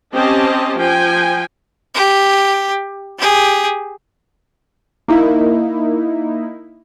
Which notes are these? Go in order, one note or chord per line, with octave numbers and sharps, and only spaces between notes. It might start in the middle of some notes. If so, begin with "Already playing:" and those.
C4 C#4 G4 C5 D#5 A5
F3 G5 G#5
G4
G4 G#4
A#3 D#4 E4